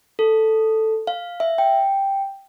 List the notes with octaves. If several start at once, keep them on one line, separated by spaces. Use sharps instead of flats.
A4
F5
E5
G5